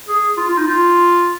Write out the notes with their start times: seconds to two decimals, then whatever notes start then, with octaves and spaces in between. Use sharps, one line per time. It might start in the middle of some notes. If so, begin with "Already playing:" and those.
0.08 G#4
0.37 F4
0.47 F4
0.57 D#4
0.67 F4